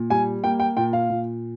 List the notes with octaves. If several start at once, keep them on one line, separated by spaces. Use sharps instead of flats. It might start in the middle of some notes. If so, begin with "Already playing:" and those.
Already playing: A#2
G3 G#5
A#3 G5
G5
A#2 G5
F5
A#2